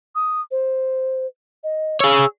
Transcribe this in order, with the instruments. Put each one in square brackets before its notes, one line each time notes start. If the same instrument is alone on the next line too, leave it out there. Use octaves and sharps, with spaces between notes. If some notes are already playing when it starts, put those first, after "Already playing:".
[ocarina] D#6
C5
D#5
[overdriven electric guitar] G#4 C#5 [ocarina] E6